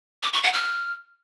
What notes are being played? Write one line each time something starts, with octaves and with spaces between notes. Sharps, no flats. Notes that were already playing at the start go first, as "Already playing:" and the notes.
D6
C#6
F#5
F6